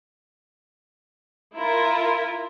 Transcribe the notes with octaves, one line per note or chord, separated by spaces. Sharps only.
E4 F4 A#4